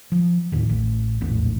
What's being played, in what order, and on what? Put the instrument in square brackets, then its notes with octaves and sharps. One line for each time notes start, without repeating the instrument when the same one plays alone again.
[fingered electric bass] F3
D#2 A2 D#3
A1
D#1 A#1 E2 A2